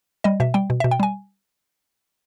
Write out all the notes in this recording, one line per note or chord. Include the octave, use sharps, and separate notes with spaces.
G3 D#5
B2 E5
G3 G5
B2
B2 E5
G5
G3 G#5